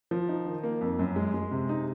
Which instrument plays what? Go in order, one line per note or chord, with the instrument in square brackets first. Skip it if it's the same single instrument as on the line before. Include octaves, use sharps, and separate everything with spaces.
[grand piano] F3
D#4
D#3
A#3
F2
F#2
G#3
G#3
C3
D#4